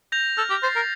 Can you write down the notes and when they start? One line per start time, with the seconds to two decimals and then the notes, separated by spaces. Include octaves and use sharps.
0.12 G6 A#6 F7
0.37 A4 F6
0.50 G4
0.63 C5 A6 C7
0.76 A#4